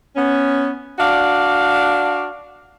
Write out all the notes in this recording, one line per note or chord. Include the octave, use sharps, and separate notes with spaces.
B3 C#4
D4 F#4 D5 F5